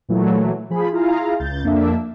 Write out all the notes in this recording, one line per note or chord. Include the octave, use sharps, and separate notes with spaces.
A#2 E3 F#3 A3
F3 G#4 B5
E4 F4 G#4 F5 A#5
C#2 G6 A6
F2 A#3 D4 E5